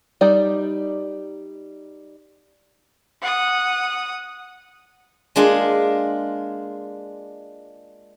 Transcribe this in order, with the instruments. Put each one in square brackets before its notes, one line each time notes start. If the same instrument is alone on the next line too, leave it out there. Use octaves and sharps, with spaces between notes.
[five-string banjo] G3 D#4 D5
[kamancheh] F#5 D#6
[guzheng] G#3 A#3 D4 F4 G#4